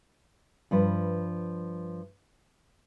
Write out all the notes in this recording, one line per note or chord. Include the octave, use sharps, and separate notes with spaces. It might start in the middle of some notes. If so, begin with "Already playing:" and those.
G2 F3 B4